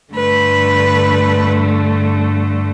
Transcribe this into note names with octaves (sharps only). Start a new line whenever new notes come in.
G2 D3 A3 B4